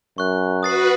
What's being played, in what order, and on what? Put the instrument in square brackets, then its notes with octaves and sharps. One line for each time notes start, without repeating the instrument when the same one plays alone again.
[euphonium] F#2 [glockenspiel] C#6 F#6
[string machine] F#4 B4 [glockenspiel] D#6 A6 C7